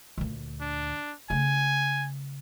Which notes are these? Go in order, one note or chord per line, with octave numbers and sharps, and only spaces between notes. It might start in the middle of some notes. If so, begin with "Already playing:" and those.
D2 A#2
D4
C#3 A3 G#5